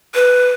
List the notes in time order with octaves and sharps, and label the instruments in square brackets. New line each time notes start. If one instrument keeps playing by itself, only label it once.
[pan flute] B4